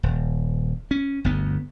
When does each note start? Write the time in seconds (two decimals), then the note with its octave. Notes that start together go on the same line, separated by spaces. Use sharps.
0.03 D#1
0.91 C#4
1.24 G1 D2 B3